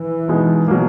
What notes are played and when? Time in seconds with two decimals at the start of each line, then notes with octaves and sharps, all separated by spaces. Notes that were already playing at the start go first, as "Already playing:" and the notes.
Already playing: E3
0.28 B2 G#3 B3 D#4
0.68 B2 F#3 A#3